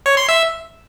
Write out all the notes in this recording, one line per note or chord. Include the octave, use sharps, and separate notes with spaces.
C#5
C6
E5